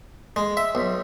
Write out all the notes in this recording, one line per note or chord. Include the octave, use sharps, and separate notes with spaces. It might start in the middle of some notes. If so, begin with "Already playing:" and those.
G#3
E5
B1